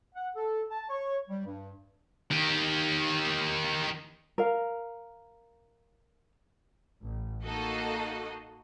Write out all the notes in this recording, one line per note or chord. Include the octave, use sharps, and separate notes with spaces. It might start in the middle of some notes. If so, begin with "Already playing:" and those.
F#5
A4
A5
C#5
G3
G2
D#3 G4
A#4 F5
A1
A#3 D#4 F#4 A4 D#5